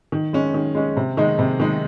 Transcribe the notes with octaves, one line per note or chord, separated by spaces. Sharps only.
D#3
G#3 C#4
D#3
G#3 C#4
C3
D#3 G#3 D#4
C3
D#3 G#3 D#4